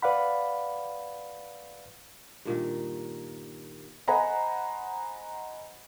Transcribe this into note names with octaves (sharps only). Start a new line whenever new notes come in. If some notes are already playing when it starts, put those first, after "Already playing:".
B4 D5 F5 F#5 B5
G2 A#2 D#3
C5 D#5 F#5 G#5 A#5 B5